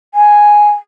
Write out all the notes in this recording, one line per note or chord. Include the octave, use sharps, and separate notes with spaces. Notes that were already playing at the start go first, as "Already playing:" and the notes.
G#5